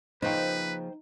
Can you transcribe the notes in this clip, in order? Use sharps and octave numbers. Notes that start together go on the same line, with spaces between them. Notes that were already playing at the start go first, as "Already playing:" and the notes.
C#3 F3 A#3 D#4 B4 C5 G5